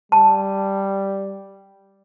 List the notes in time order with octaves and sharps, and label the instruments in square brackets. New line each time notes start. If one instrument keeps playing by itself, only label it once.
[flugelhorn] G3 [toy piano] A5